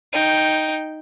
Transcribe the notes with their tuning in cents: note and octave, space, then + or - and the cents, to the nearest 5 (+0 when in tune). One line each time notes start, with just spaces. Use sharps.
D#4 +0 G5 +0